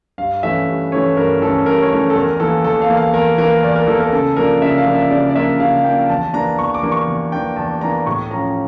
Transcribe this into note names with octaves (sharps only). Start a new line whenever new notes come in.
G2 F5
E3 A3 C#4 E5
G2
E3 A3 C#4 C#5
G2 A#4
E3 A3 C#4 A4
G2 A#4
C#5
E3 A3 C#4
A4
E2 A#4
E3 A#3 A4
E2 A4
F5
E3 A#3
F5
E2 A#4
E3 A#3 A#4
E2 D5
A#4
E3 A#3 A4
A#4
C#3 A4
F3 A#3 D4 A#4
C#3 E5
F5
F3 A#3 D4
E5
C#3 D5
D5
F3 A#3 D4 E5
C#3 F5
F3 A#3 D4 G5
E2 A5
E3 A#3 D4 A#5
E2 C#6
D6
E3 A#3 D4
C#6
E2
E3 A#3 D4 G5
E2 A5
E3 A#3 D4 A#5
A2 C#6
F3 C#4 A#5